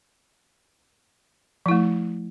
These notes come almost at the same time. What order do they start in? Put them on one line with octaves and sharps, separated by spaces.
F3 E4 A3